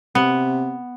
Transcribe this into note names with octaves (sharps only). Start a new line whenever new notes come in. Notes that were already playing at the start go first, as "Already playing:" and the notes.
C3 B3